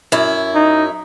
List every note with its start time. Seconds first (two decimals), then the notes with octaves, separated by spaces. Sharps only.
0.12 F#2 E4
0.55 D#4